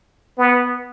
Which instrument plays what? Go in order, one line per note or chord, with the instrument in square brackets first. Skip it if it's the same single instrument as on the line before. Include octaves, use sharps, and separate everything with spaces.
[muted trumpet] B3